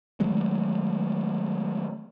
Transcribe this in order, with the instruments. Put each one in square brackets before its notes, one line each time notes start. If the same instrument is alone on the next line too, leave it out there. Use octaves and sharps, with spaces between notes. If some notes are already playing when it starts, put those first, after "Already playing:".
[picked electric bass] D#3 F#3 G#3 A3